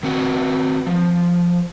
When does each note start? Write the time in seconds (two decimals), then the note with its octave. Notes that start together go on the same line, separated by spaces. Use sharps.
0.03 D#3 C4 F#4 B4
0.87 F3